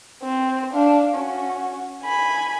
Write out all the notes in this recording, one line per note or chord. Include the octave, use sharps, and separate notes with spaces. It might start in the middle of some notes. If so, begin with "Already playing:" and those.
C4 C5
D4 F5
C#4 F#4
G#5 B5